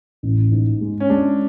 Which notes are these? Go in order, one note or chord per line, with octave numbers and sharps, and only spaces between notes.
A1
G#2
G#3
C#4
G#3 D4